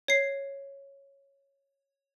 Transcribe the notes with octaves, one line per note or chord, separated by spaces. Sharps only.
C#5 C7